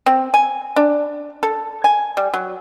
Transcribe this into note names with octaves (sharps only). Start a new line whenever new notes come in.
C4
G#5
D4
A4
G#5
G3
F#3